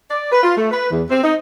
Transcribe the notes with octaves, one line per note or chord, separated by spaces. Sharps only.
D5
B4
F4
A3
B4
E2
C4
D#4